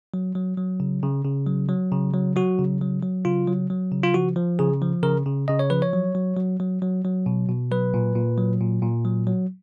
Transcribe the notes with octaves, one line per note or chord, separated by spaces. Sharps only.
F#3
F#3
F#3
C#3
C#3
C#3
F#3
F#3
C#3
F#3
F#3 F#4
C#3
F#3
F#3
C#3 F4
F#3
F#3
C#3
F4
F3 F#4
F3
C#3 G#4
F3
C#3 A#4
C#3
C#3 D#5
C#5
F3 B4
C#5
F#3
F#3
F#3
F#3
F#3
F#3
B2
B2
F#3 B4
A#2
A#2
F#3
A#2
A#2
F#3
F#3